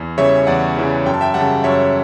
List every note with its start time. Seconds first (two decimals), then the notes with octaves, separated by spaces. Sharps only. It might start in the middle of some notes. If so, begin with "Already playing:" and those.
Already playing: E2
0.18 C#3 E3 G3 C#5 E5
0.47 E2 D5 F#5
0.77 C#3 E3 G3
1.05 F#2 G5
1.14 A5
1.21 E5 G5
1.34 G3 F#5 A5
1.39 C#3
1.64 F#2 C#5 E5